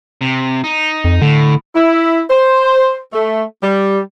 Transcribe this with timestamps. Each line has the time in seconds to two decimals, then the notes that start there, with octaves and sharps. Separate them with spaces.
0.21 C3
0.64 D#4
1.04 F2
1.22 A2 D3
1.75 E4
2.30 C5
3.13 A3
3.63 G3